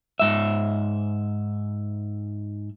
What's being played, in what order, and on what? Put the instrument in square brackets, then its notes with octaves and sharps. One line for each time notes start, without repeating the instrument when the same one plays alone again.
[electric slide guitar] G#2 E5